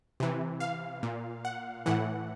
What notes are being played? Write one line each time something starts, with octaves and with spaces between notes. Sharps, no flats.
C3 E3
F5
A#2
F#5
A2 E3 F#5